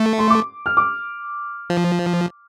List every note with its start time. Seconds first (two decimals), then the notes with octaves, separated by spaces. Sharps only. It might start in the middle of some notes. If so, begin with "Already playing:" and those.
Already playing: A3
0.18 C6
0.30 D6
0.66 F6
0.77 D6
1.70 F3